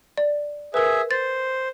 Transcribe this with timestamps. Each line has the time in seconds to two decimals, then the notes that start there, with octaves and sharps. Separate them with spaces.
0.18 D5
0.74 G#4 A#4 B4 E5
1.11 C5 A6